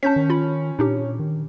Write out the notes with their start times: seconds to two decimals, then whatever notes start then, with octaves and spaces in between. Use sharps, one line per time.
0.03 C#4 A5 G6 B6
0.16 D#3
0.30 F4 B5
0.79 A#2 D4 D#4 G4
1.19 D#3